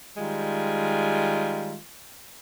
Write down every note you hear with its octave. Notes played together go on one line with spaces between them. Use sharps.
D#3 G3 G#3 F4